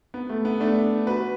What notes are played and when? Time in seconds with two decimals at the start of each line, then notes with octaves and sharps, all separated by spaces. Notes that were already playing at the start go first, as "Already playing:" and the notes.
0.14 B3
0.29 A3
0.45 B3
0.60 A3 D4
1.07 F#4 B4